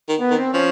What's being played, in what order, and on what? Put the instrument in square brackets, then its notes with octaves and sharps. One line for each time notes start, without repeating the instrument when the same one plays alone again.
[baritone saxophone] D#3
[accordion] B3
[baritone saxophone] D#3
[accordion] C4
[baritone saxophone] F3 [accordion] C#4